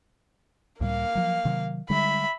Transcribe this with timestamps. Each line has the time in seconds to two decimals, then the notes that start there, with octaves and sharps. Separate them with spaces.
0.81 C#2 A2 G3 A#3 F5
1.15 F3 F#3
1.45 C3 D#3 F#3
1.90 D3 G3 G#3 E5 B5